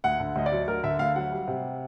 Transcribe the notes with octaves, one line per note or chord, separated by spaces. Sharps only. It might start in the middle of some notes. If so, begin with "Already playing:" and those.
D2 F#5
D3
D2 D#5
D5
F#3
D2 A#4
D3 E5
D2 F5
F#3 F#5
G3
C3